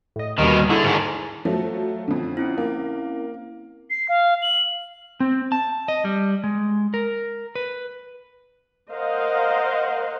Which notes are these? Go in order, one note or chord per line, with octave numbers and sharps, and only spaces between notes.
A2 D#5
D#2 B2 D#3 G3 A#3
D3 E4 G#4 C#6
G#2 D#3
F3 F#3 A3
F2 D3
C4 C#4 E4
A#3
C7
F5
F#7
C4
A5
D#5
G3
G#3
A#4
B4
A#4 C5 D#5 F5 F#5